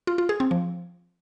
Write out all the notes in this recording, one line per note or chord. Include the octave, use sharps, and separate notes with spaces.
F4
F4
G#4
C4
F3